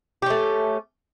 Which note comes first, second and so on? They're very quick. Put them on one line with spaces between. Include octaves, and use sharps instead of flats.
G4 C#4 A3